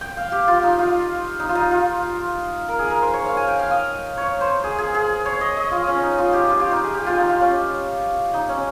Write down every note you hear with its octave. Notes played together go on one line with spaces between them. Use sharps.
G5
F5
G4
F4
D#4
F4
D#4
F4
D#4
F4
A#4
G#4
A#4
C5
C#5
F5
G#5
G5
F5
D#5
C#5
C5
G#4
G#4
G#4
C#5
D#5
D#5
F4
C#4
D#4
F4
G4
F4
G4
D#4
G#4
G4
F4
D#4
F4
C#4
D#4
C#4